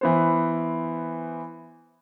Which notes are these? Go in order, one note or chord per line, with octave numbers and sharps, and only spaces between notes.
E3 B3 C5